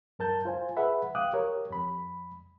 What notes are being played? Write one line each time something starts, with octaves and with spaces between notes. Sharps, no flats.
F#2 A#4 A5 G6
F4 C5 G#5
G#4 B4 E5 F#5 B5
F5 G5 D6 D#6 F#6
G4 A#4 C#5
F2 B5